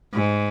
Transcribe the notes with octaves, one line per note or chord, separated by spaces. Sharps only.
G#2